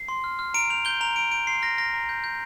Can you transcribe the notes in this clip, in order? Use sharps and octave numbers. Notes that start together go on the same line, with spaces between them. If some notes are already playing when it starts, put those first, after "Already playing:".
Already playing: C7
C6
F6
F6
A#5 D7
G6 F7
G6 G7
A#5 F7
G6 D7
G6 D7
C6 C7
F6 A#6
F6 A#6
A#5
G6
G6